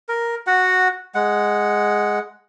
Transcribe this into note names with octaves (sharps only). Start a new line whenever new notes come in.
A#4
F#4 F#5
G#3 F#5